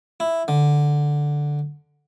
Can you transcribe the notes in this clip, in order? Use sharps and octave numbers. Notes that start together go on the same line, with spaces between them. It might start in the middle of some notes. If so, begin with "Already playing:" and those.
E4
D3